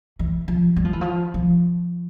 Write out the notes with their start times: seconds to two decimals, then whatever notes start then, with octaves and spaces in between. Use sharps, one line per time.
0.19 E3
0.48 F3
0.76 G3
0.85 F3
0.93 E3
1.01 F3
1.34 F3